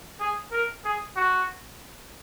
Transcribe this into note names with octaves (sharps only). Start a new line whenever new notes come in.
G#4
A#4
G#4
F#4